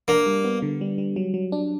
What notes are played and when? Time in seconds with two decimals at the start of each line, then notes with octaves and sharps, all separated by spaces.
0.08 A#3 D4
0.26 G3
0.44 B3
0.62 D3
0.81 G3
0.98 G3
1.16 F#3
1.34 F#3
1.52 D4